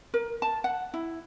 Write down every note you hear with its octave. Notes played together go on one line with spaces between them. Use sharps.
A#4
A5
F#5
E4